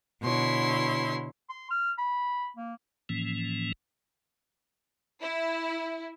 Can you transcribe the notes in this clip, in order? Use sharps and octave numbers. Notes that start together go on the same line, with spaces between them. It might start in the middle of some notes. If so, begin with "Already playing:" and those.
B2 D3 E4 C#5 C6
C6
F6
B5
A#3
A2 E3 F3 A#3 C#4
E4